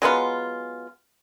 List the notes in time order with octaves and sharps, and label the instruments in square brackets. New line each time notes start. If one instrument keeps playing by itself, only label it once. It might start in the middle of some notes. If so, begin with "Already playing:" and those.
[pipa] F#3 G#3 B3 F4